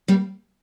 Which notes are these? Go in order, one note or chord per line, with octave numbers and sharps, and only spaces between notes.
G3 A#3